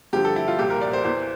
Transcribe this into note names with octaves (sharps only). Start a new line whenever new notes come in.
G2 D3 F3 G4
A4
E4
F4
C2 A#2 F3 G4
A#4
D5
C5
E2 E3 C5